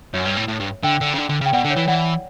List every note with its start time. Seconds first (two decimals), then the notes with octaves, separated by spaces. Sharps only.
0.14 F#2 C#5 E5
0.25 G2
0.37 A2
0.48 A2
0.60 G2
0.83 D3 E5 G5
1.01 D3
1.14 C#3
1.18 D3
1.29 D3
1.41 C#3
1.46 G5
1.53 B2 D5 F#5
1.65 D3
1.70 C#5 E5
1.76 E3
1.88 E3 D5 F#5